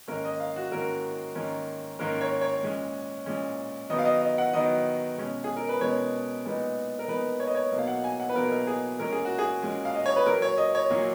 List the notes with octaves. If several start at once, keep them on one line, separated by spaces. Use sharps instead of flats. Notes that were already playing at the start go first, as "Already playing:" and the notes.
G#2 D#3 A#3 C#4 A#4
D#5
F5
F#4
G#2 D#3 A#3 C#4 A#4
G#2 D#3 A#3 C#4
G#2 D#3 A#3 C#4 A#4
C#5
C#5
A#2 G#3 C#4
A#2 G#3 C#4
D#3 F#3 B3 D#4 D#5
F5
D#5
D#5
F#5
D#3 F#3 B3 D#4 D#5
B2 G#3 C#4
G#4
A#4
B4
B2 G#3 C#4 C#5
A#2 G#3 B3 D#4
A#4
A#2 G#3 B3 D#4 B4
C#5
D#5
C#5
B2 F#3 A#3 D#4
F5
F#5
G#5
F#5
B4
B2 F#3 A#3 D#4 A#4
A#4
G#4
A#2 G#3 C#4 A#4
G#4
F#4
G#4
A#2 G#3 C#4
F5
D#5
C#5
B4
A#2 F#3 A#3 A#4
C#5
D#5
C#5
A#2 F#3 A#3